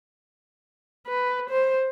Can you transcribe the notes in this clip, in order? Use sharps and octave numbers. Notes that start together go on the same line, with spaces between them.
B4
C5